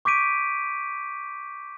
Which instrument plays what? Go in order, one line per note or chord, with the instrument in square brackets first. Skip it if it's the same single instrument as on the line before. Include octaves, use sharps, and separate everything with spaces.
[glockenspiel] C#6 D6 G6 B6 D7 D#7